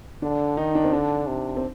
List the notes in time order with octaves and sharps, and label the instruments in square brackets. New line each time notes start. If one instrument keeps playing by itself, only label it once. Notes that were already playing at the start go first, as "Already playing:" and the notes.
[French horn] D3 [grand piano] D4
[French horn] D#3 [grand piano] D#4
[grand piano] D4
C4
[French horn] D3 [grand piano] D4
[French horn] C3
[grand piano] C4